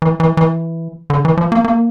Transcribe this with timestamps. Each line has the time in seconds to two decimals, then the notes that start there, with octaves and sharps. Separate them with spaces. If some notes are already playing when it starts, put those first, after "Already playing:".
0.02 E3
0.20 E3
0.37 E3
1.10 D3
1.25 E3
1.37 F3
1.52 A#3
1.64 A#3